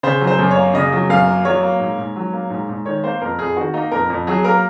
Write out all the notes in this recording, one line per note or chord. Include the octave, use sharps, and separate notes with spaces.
C#3 C5
F#3
C5
F#2
C#5
A#3
C#3 D#5
F#3
F#2 F5
A#3
F#3 C#5
A#3
G#2
G#2
F#3
A#3
G#2
G#2
D#3 C#5
A#3 C5
F2 A#4
F2 G#4
D#3 F#4
A#3 D#4
F2 A#4
F2
F#3 G#4
A#3 A#4